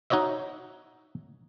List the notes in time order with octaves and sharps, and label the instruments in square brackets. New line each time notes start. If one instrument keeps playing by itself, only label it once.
[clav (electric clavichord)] D#4 F#4 C#5 D#5 E5